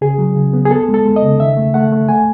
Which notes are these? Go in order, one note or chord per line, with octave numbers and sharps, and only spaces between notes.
C#3 G#4
F#3
C#3
B3
G#4
B3 A4
G#3
A4
G#3
D#5
C#3
D#3 E5
A3
A3 F#5
A3
A3 G#5